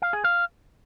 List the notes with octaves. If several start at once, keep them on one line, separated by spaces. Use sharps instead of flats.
F5
G#4
F5